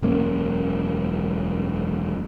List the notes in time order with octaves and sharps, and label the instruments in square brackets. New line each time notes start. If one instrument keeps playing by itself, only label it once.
[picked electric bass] E1 F#2 A#3 C#4